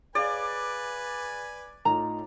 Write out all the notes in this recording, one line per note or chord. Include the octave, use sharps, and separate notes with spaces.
G#4 B4 D5 F5 G#5
A2 D#4 F4 A#5